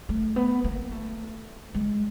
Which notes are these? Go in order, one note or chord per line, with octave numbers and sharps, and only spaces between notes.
A3
B3
A#3
A3
G#3